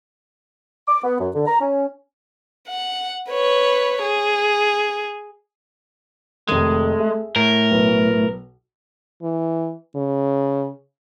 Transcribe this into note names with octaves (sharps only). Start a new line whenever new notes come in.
D6
B3
F#2
D3
A#5
C#4
F#5
B4 C#5
G#4
F1 D#3 G#3 A3
G#4 E5
A2 A#4
B1 B4
E3
C#3